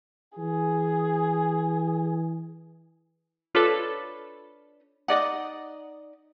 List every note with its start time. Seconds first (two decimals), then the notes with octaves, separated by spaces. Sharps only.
0.38 E3 G#4
3.55 D4 F4 A4 B4 C#5
5.08 D#4 D5 D#5 F#5